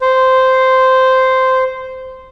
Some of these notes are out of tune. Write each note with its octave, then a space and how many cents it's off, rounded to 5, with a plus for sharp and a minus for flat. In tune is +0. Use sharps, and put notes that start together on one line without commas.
C5 -10